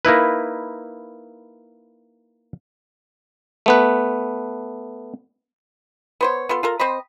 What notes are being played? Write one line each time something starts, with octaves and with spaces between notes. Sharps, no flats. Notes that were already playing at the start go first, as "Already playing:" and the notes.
A#3 D#4 E4 B4
A3 B3 B4
B3 C5 C#5
B3 F4 A4
F4 A4 A#4
C4 C5 D#5 B5